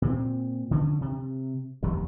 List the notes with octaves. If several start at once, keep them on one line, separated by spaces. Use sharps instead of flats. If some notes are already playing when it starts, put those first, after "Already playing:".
A#2 C4
D3 C#4
C3
F1 E2 D#3 G3